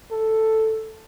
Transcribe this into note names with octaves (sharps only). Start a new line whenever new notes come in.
A4